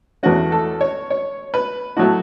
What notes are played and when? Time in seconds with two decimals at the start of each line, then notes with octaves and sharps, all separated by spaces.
0.23 E2 E3 A3 C#4 F#4
0.52 A4
0.81 C#5
1.10 C#5
1.54 B4
1.97 A2 F#3 A3 F#4